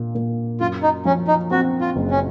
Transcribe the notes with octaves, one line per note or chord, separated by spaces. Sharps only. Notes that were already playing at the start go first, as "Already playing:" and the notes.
Already playing: A#2
A#2
F#2 F4
D#4
F3 C#4
D#4
C4 F#4
F4
F#1
C#4